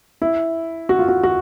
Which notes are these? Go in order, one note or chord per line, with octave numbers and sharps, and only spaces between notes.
E4
F#4
F4
F#4
F#4